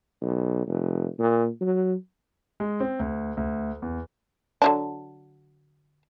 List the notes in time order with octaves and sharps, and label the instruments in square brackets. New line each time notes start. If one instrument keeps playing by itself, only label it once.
[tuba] B1
F1
A#2
F#3
[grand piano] G#3
C4
D2
D2
E2
[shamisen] D3 F#3 D4